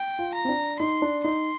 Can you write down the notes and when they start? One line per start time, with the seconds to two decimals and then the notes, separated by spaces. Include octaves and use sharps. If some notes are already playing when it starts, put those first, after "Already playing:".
Already playing: G5
0.19 F4
0.34 A#5
0.45 C4
0.49 D4
0.79 D#4 C6
1.02 D4
1.24 D#4 C6